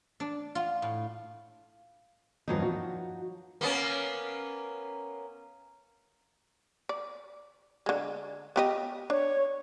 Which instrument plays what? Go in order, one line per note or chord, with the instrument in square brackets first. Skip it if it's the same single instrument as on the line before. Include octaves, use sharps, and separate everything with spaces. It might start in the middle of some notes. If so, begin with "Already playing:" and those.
[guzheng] D4
F4
A2
[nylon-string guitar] E2 G2 D#3 [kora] F3 F#3 D#4
[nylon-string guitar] F#4
[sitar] A#3 B3 C#4
[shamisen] D5
D3 G#3
B3 G4 D#5
[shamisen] D4 [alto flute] C#5